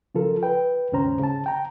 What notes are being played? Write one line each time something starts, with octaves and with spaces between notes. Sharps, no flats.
C#3 F3 F4 A4 A#4
B4 G5
D#2 G#2 C#3 C#4 C5 A#5
C#3 A5
G5 A#5